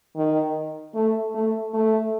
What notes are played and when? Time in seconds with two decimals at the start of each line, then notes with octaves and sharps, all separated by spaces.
0.16 D#3
0.95 A3
1.35 A3
1.74 A3